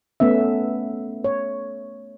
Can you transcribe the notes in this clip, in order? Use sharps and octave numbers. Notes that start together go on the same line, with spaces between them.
A3 B3 C#4 E5
C#5